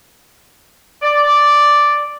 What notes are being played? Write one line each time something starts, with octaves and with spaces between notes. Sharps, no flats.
D5